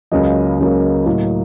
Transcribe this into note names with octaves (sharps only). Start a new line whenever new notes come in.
C#2 C#3 F#3 A#3 D#5
C#2 C#3 F#3 A#3
A2 F#3 A#3